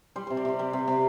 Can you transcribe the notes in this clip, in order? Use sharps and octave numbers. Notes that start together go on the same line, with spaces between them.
G3 C5
C3 C5
D5
C3 C5
G3 B4
C3
C3